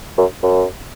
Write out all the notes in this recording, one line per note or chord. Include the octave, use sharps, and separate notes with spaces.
F#2
F#2